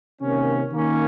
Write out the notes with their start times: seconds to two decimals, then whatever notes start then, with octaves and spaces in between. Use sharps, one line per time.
0.21 C3 D#3 A#3 C#4
0.73 D#3 A#3 C#4